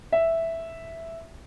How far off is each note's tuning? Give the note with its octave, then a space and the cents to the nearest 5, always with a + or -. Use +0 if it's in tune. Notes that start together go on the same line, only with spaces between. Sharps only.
E5 +0